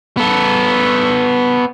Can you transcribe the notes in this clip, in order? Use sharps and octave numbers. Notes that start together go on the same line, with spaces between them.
B3 A4